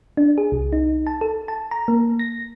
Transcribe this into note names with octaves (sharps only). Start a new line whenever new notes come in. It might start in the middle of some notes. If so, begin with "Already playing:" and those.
D4
G#4
C2
D#4
A5
A4
A5
A#5
A#3
A#6